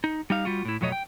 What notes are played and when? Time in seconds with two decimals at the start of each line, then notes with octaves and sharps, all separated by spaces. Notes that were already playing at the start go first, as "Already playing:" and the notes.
0.04 D#4
0.30 G3 D#4 F5
0.45 G3 F4 F#4
0.65 A2 E4
0.81 F2 B2 F#3 A3 C#5 D#5
0.92 G5